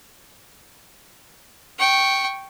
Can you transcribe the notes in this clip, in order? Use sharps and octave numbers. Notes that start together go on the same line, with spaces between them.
G5 C#6